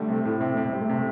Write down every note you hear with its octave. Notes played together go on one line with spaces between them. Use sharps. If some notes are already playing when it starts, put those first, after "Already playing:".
Already playing: D3 G3 A3
C3
A2
C3
C3 A3
C3 G3
A3
C3